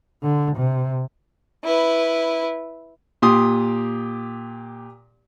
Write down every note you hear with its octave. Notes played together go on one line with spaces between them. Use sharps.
D3
C3
E4 B4
A#2 G4 C6 D#6